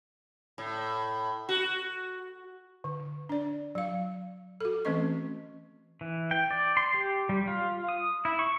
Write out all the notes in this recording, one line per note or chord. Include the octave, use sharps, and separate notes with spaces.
A2
F#4
D3
D4 D5
F#3 F5
F#4 A4
E3 A3 C4 C#4 D#5 C#6
E3
G5
D5
C6
G4
G3
F4
D#6
E4
C#6